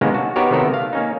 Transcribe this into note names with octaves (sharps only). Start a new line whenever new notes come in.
C3 D#3 G#3 A#3 B3 C#4
F#4 A5
B3 D#4 F#4 G4 A#4 C#5
C3 D#3 A3 B3 A4 A#4
F5
A#3 C#4 D#4